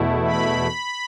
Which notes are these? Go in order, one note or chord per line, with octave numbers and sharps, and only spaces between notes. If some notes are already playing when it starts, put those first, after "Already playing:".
Already playing: E2 B2 A3 E4
B5